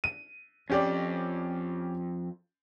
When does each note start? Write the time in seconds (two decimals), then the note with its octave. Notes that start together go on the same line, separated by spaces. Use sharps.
0.04 D#7
0.70 F2 C#4 G4 D5